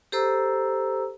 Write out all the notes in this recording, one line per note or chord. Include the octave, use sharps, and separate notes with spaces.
G4 A4 C5 A#5 E6